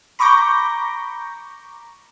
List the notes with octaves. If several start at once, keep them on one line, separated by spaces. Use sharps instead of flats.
A#5 B5 C#6 D6 G6 A#6